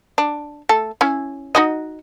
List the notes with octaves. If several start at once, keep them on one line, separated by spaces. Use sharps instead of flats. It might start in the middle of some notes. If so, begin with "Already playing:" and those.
D4
A3 A4
C#4 E4
D#4 F#4 D#5